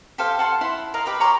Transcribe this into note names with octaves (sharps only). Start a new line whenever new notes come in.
G4 A4 C5 F5
F#5 A5 C6
E4 F#5 C6
A#4 D#5 F5
G4 B4 B5
C#5 A#5 C6 D6